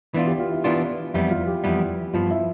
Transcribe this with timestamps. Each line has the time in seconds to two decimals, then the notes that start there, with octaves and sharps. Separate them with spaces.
0.14 E3 B3 D4 F4
0.27 G4
0.40 F4
0.52 E4
0.64 E3 B3 D4 E4 F4
1.14 F2 E3 G3 B3 E4
1.30 F4
1.47 G4
1.64 F2 E3 G3 B3
2.14 G2 F3 B3 F4
2.31 E4